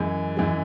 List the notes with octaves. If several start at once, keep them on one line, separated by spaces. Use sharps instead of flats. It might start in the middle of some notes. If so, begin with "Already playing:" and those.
Already playing: F#2 E3 G#3
F#2 E3 G#3